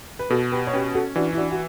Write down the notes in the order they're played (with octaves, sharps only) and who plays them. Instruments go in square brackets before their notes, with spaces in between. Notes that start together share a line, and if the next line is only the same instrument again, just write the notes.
[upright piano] B4
[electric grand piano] B2 [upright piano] F#4 A4
[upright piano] G4 B4
C#5
[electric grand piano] C#4 [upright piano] G4 B4
[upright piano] F#4 A4
[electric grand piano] E3 [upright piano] D4 F#4
[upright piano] E4
D4 F#4
F#4